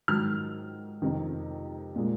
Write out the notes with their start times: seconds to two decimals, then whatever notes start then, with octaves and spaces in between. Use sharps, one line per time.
0.08 G#2 D#3 F#3 F6
1.02 F2 C3 D#3
1.96 A#2 G#3